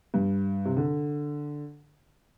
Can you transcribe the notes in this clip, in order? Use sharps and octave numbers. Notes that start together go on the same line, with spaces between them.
G2
C3
D3